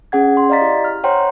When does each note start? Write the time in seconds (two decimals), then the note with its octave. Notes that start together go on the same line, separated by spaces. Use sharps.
0.12 C#4 G#4 F#5 G#6
0.37 C6
0.50 D5 D#5 F5 A#5 A6 B6
0.61 E4 G4
0.84 F6
1.04 C5 C#5 F#5 G5 A#5 C6